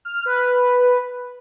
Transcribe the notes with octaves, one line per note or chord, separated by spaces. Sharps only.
F6
B4